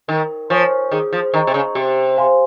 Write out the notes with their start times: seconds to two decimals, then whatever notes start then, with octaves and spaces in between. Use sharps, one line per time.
0.08 D#3 A#4
0.50 F3 C#5 G#5 C#6
0.91 D#3 G#4
1.13 F3
1.34 D#3 D#5 A#5 C#6
1.47 C3
1.54 C#3
1.75 C3 G4
2.18 C5 F5 G#5 C6